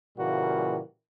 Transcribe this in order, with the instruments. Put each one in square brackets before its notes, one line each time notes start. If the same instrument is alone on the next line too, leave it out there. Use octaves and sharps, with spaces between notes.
[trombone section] A#2 C#3 E3 G3 A#3 F#4